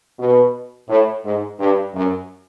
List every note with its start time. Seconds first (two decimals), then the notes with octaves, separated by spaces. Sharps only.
0.19 B2
0.89 A2
1.25 G#2
1.60 G2
1.95 F#2